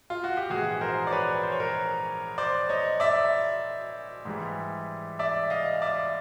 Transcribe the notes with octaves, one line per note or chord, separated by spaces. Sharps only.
F4
F#4
G4
A#1 G#2 E3 F#4 G#4
A#4 C5
D5
B4 C#5
C5
C#5
A#4 C5
C5 D5
C#5 D#5
D5 E5
G#2 E3 G3
D5 E5
D#5 F5
D5 E5